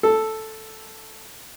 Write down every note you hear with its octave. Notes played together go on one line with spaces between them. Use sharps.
A4